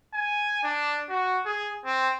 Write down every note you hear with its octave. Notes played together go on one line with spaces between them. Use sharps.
G#5
D4
F#4
G#4
C4